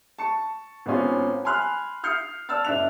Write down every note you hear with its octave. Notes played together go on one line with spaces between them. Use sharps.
A5 C#6 C#7
G#1 B3 C#4 F4
G#5 B5 C6 F6 F#6
D#6 F6 G6 C7 C#7
D5 A5 E6 F6 A6
F#1 D5 E5 F#6 F7